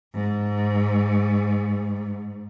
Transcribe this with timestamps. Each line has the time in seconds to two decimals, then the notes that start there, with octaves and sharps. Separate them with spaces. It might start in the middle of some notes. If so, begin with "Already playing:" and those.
0.14 G#2